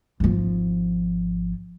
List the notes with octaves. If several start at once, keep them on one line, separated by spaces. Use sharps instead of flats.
G#1 F3